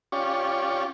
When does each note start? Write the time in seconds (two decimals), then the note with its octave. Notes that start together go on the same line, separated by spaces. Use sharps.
0.12 C#4 F4 G4 D5 C#6